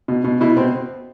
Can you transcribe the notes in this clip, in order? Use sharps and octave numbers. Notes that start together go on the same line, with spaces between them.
B2
B2
B2 E4
B2 C4